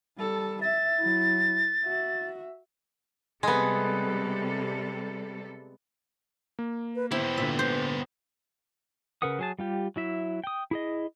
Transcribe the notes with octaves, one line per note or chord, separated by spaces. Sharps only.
G3 A4
E5 A6
F#3 E4
F#4 E5
C3 G3 G#3 B3 A4
A#3
B4
B3 E4 G4 C5
A#2 D3 E5
B4 C5
C#3 A#4 B4 F#5 D#6
F#3 G#4 A5
G3 F4 G4
F#3 E4 E5
G5 D#6
E4 G#4 D#5